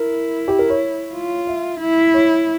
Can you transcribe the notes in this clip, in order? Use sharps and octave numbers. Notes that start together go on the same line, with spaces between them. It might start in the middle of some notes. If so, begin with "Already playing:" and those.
Already playing: E4 A#4
G4
A#4
C#5
F4
E5
E4
C#5